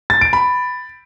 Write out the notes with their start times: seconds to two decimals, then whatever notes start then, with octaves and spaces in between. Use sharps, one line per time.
0.10 A6
0.21 D7
0.33 B5